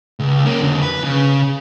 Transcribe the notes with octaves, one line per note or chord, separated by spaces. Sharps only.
C#2
A#3 C#4
F2 D3
B4
C#3